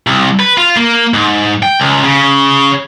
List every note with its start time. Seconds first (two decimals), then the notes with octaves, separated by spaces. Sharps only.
0.07 C2
0.40 B4
0.58 F4
0.77 A#3
1.14 G#2
1.63 G5
1.80 C#2
2.04 C#3